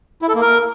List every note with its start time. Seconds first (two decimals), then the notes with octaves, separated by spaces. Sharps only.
0.22 E4
0.29 A4
0.35 A#3
0.41 A#4